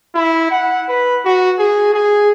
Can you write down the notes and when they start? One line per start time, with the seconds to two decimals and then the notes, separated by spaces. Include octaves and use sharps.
0.15 E4
0.51 F#5
0.89 B4
1.25 F#4
1.59 G#4
1.94 G#4